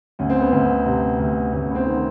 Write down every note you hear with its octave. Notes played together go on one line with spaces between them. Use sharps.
D2 C#4
C4
B3
D2 C4
C3
D2
D2 C#4
B3
C4
D#3